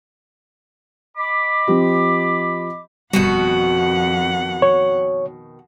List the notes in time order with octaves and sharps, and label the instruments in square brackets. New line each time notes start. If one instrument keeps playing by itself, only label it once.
[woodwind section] D#5 B5 D6
[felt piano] F3 C4 G4
[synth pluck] G1 G3 [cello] F2 F#5 [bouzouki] B2 D#3 F#4
[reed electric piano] C#5